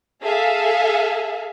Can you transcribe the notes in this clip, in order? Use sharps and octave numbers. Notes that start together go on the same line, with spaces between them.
G#4 A4 E5 F5